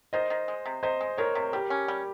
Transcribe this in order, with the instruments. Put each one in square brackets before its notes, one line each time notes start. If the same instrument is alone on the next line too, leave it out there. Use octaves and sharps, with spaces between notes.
[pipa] D#3 [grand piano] C5 D#5
[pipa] D#3
G#3
C3
[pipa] C3 [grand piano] C5 D#5
[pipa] G#3
[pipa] D#3 [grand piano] A#4 C#5
[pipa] C3
[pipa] G3 [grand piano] G4 A#4
[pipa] C#4
G3